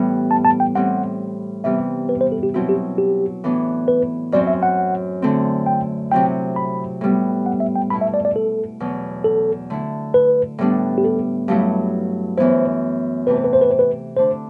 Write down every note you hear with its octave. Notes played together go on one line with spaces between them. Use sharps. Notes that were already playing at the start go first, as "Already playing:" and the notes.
Already playing: A2 E3 G3 B3
A5
A5
G5
A2 G3 C4 F#5
C3 E3 G3 B3 E5
B4
C5
A4
G4
B2 F#3 C4 E4 F#4
G4
G4
A2 E3 B3 D4
B4
F#2 F#3 C4 D5
E5
F#5
D3 A3 C4
G5
C3 F#3 C4 E4 G5
B5
A2 G3 B3
F#5
E5
G5
B2 A3 E4 B5
E5
D5
D5
A4
E2 B2 F#3
A4
D3 A3 E4
B4
A2 G3 B3 D4
G4
A4
G2 F#3 A3 E4
F#2 E3 B3 E4 C5
C3 E3 A3 B4
C5
B4
C5
B4
C5
B4
D3 A3 D4 C5